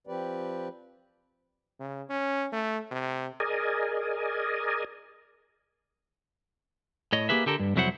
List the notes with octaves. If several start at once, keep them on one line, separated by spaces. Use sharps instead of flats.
F3 C4 G4 B4 D5
C#3
C#4
A3
C3
G#4 A#4 D5 D#5 G#5
A2 C#5 D#5
A#3 D4 G4 G#4 B4 E5
D3 G4 A4 A#4
G2
C2 F2 F#3 E4 C5 F#5